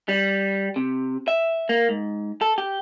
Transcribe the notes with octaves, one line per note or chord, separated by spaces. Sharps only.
G3
C3
E5
A#3
G#2
A4
G4